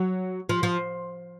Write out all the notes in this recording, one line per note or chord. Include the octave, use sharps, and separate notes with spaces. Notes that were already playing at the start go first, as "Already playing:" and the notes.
Already playing: F#3
F3
F3